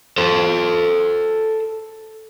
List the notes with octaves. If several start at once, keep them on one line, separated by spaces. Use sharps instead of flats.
A4 C5